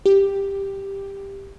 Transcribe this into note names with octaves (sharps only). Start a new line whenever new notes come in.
G4